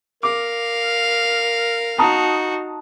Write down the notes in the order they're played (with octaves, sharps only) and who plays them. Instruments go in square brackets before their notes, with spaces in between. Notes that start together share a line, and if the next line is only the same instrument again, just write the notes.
[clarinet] A#4 [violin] F5 [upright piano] D6
[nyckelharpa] D#4 F#4 [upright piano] A5 A#5 D#6